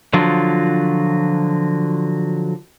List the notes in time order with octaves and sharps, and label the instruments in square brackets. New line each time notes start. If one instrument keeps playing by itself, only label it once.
[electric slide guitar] D3 F3 F#3 F4